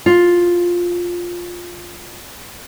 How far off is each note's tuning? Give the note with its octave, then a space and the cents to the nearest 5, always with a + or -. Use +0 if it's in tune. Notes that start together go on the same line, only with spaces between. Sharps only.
F4 +5